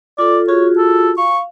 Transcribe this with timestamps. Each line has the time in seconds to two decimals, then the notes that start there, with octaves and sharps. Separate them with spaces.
0.18 F4 A4 D5
0.48 F4 F#4 G#4 C#5
0.77 A4
1.18 F5 C#6